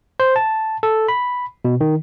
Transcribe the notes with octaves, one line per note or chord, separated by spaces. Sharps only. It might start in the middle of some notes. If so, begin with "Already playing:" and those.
C5
A5
A4
B5
B2
D#3